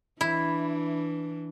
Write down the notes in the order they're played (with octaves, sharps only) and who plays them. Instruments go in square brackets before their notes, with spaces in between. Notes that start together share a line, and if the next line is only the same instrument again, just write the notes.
[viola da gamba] E3 D4 [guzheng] E4